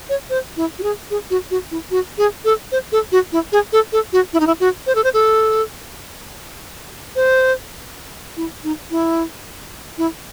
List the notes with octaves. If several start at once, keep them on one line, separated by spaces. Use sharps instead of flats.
C#5
C5
E4
F#4
G#4
G#4
F#4
F#4
E4
F#4
G#4
A4
C5
A4
F#4
E4
G#4
A4
A4
F#4
E4
D#4
E4
F#4
C5
A4
C5
A4
C5
E4
D#4
E4
E4